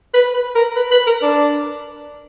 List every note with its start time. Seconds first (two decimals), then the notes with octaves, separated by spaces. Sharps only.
0.14 B4
0.34 B4
0.55 A#4
0.76 B4
0.91 B4
1.07 A#4
1.22 D4